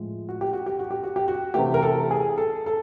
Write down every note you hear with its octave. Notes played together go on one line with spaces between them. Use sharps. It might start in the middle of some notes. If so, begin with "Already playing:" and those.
Already playing: A2 F3 G#3
F#4
G4
F#4
G4
F#4
G4
F#4
G4
F#4
C3 E3 A3 G4
A#4
A4
G#4
A4
A4